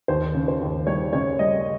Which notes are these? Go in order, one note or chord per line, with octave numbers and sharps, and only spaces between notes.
D#2 C5
C#3
C5
D#2
G3 C#5
C#3 C#5
G3 D#5